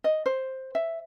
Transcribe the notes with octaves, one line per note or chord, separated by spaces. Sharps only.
D#5
C5
E5